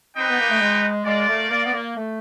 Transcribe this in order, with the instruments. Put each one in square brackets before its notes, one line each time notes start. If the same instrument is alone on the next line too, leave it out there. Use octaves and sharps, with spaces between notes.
[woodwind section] C4 [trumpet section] D#4 F#4 B4 D#5 G5
[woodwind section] B3
A#3
A3
G#3
[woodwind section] G#3 [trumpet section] F4 A#4 D5
[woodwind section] A3
A#3
B3
A#3
A3